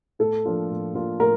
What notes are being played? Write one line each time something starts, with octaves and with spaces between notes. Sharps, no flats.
A2 A4
F3 A#3 D4 F4
A2
F3 A#3 D4 F4
A2 A#4